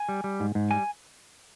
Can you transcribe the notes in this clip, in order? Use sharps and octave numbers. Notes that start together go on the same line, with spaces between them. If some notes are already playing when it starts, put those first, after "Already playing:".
Already playing: G#5
G3
G3
G#2
G#2
G3 G#5